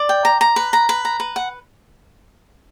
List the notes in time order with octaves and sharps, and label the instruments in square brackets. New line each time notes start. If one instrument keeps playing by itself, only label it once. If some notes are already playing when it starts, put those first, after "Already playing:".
Already playing: [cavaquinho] D5
G5
A#5
A#5
B4
A#5
B4
A#5
B4
F#5